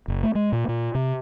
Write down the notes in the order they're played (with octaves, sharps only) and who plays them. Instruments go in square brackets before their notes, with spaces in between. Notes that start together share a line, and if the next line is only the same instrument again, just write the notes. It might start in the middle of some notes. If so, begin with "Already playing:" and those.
[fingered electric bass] F#1
A3
G#3
A#2
A#2
C3